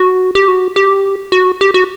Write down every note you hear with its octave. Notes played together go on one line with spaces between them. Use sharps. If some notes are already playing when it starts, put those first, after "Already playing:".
Already playing: F#4
G4
F#4
G4
F#4
G4
F#4